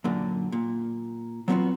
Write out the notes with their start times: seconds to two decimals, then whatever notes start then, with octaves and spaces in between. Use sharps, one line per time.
0.04 F#2 A#2 D3
0.52 A#2
1.48 F#3 B3 C4 D#4 F4 F#4